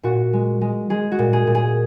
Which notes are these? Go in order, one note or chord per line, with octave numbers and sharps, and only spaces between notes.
A#2 F#4
G#3
G#3
G#3 G#4
F#4
A#2
G#4
A#2
G#4